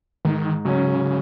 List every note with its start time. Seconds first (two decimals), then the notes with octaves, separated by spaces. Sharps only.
0.25 G#2 D#3
0.65 C#3 F#3 C#4